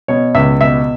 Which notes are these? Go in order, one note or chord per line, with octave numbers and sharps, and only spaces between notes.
B2 C#5
C#2 E5
B2 E5